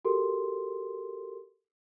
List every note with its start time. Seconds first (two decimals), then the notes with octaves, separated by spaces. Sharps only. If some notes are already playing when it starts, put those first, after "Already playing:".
0.05 F#4 G4 A4 A#4 C6